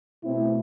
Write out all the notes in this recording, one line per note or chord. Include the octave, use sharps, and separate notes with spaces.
B2 A3 C4 E4